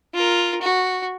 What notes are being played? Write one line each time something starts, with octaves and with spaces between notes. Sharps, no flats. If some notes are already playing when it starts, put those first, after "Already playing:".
F4 A#4
F#4